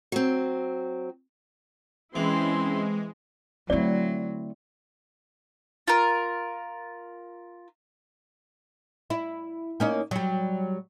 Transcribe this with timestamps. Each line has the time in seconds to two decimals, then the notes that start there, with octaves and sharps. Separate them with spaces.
0.12 F#3 C4
2.15 E3 G#3 C4 C#4 E4 C6
3.70 D3 F#3 A3 C4 E4 F4 D5
5.88 F4 A#4
9.10 E4
9.80 A#3 C#4 D#4
10.11 F#3 G3